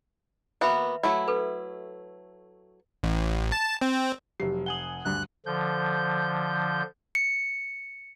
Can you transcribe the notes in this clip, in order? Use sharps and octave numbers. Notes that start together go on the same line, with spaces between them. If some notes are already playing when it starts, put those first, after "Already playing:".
A#3 B3 F#4 B4 E5 B5
F#3 A3 E4
A4 B4
A1
A5
C4
F1 F#3 G4 C7
F#5 G#5 D#6 F#7 G7
D2 G2 F#6
D3 F3 G6
C#7